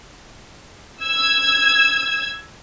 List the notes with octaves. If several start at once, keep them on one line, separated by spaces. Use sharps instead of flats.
E6 G#6